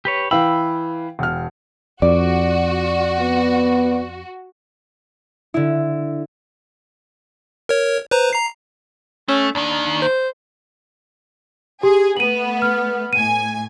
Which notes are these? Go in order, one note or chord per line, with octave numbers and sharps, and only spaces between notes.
G4 B4 C#5
E3 F5 G5 B5 E6
E1 F6
F2 F#4 D5
B3
D3 E4
A#4 C#5
B4 C5 A#5
A#5 C7
A3 C#4
D#2 D#3 D4
C5
G4 G#4
A3 B3 D#7 F#7
F6
A2 G#5 D#7